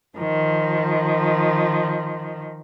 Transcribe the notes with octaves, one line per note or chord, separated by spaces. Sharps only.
D#3 F3